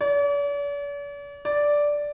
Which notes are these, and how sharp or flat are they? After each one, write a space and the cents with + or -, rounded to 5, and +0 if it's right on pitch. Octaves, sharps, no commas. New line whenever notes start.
D5 -45
D5 -5